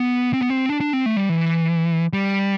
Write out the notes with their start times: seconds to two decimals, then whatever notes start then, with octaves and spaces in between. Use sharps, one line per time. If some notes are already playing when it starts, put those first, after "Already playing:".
Already playing: B3
0.33 C4
0.41 B3
0.49 C4
0.69 D4
0.81 D4
0.93 C4
1.06 A3
1.17 G3
1.29 E3
2.13 G3